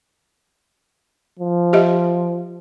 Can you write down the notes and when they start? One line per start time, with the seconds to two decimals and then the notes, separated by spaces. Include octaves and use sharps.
1.39 F3
1.73 G4 D#5 E5